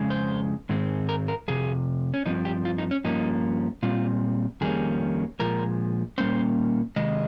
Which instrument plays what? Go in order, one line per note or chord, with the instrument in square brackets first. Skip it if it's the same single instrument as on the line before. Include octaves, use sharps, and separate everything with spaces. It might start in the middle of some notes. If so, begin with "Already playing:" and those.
Already playing: [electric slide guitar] F2 C#3 G#3
C5
G#2 D#3 G#3 C4
A#4
A#4
F2 C3 G#4
C#4
G2 F3 C4 D#4
G4
F4
D#4
C#4
G2 F3 A#3 C#4 D#4
A#2 G3 C4 F4
F2 D#3 G3 A#3 C#4 G#4
A#2 F3 G#3 A#4
A#2 G3 A#3 C#4 C5
C3 D#3 G#3 D#5